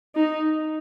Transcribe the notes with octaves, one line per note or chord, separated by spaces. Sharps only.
D#4